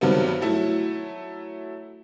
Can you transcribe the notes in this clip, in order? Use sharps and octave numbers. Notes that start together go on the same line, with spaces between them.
G2 C3 D#3 F#3 B3 C4
F#3 A3 E4